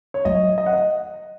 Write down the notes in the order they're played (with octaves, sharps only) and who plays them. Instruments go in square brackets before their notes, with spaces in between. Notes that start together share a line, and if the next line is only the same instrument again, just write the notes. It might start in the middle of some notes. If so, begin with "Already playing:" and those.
[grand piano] C#5
[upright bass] F#3 [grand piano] D#5
[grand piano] D#5
F#5
D#5